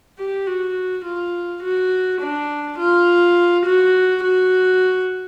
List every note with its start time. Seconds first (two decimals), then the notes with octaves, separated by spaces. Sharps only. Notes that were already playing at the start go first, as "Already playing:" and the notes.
0.18 G4
0.47 F#4
1.05 F4
1.63 F#4
2.21 D4
2.79 F4
3.66 F#4
4.24 F#4